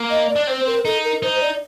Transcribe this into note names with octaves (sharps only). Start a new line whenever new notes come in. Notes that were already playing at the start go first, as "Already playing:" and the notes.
Already playing: A#3
D#5
D5
D4
C4 C5
A#4
D#4 A4
A#4
D#4 C5
D5